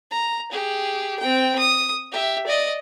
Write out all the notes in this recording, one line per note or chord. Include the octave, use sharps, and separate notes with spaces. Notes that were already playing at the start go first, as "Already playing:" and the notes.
A#5
G4 G#4
C4 G5
D#6
G4 E5
D5 D#5